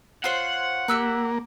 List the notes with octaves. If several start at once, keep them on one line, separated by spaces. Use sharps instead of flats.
F4 C5 C#5 F#5
A#3 G4 E6 F#6